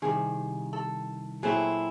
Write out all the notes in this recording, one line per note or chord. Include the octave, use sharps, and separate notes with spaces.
C2 C3 D#3 G#4
A4
A#2 F#3 A3 C4 E4 G#4